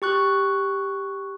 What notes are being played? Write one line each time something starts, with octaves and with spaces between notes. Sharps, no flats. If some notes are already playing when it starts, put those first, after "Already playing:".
G4 C#6 F#6